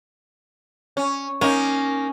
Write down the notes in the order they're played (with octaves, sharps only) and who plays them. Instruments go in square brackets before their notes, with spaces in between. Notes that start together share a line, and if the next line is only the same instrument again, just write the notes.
[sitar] C#4
[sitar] A#3 D#4 [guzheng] C#4